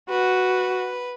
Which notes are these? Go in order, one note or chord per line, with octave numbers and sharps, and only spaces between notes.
F#4 B4